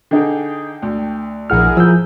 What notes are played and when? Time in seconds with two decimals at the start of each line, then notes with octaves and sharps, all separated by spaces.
0.11 D3 D#4 G#4 G5
0.82 D2
1.50 A#1 E4 G#4 A#4 F#5 F6
1.77 F3 E6 G6